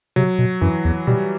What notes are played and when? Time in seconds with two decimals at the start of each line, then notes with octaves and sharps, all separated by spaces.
0.16 C3 F#3
0.39 B2
0.61 F#2 E3
0.85 E2
1.07 B2 G3